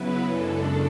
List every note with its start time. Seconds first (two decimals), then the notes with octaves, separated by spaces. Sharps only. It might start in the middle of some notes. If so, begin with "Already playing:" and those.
Already playing: C#3 F#3 B3 E4 B4
0.25 F#2 C#3 G#3 D4 A4